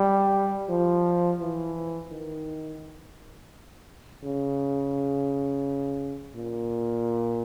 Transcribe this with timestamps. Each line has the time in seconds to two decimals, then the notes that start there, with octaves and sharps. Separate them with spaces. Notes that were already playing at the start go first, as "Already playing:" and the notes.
Already playing: G3
0.69 F3
1.40 E3
2.11 D#3
4.23 C#3
6.35 A#2